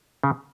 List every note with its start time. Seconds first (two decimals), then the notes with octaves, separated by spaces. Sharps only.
0.24 C#3